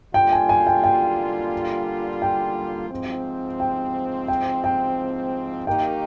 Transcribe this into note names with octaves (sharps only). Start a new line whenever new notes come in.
D3 G3 A#3 F4 G5
G#5
G#5
G5
G5
G5
G#2 F3 C4
G5
G5
G5
D#3 A#3 D#4 G4 A#4 G5